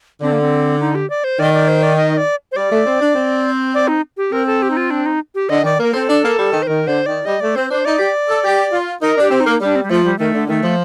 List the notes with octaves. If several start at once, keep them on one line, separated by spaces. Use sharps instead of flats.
D3 C4
A#3
C4
D#4
G4
D5
C5
D#3 D5
D5
C5
D5
D#5
D5
C5
G3 D5
A3
C4
D4
C4
D5
D#4
G4
C4 A#4
A4
G4
D#4
F4
D4
D#4
G4
D3 D#5
D#3 D5
A#3 A#4
C4 A4
D4
A#3
G3
D#3
C5
D#3 A#4
D3 C5
D#3 D5
G3 D#5
A3 D5
C4 C5
D4 C5
D#4 D5
G4
A4
G4
F4
D#4 A#4
D4 G4
C4
D#4
A#3
G3 D4
C4
G3
F3 A3
G3
D#3 A3
D3
D#3 A3
F3